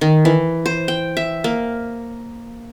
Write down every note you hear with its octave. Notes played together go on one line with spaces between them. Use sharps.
D#3
E3
C5
G5
E5
A#3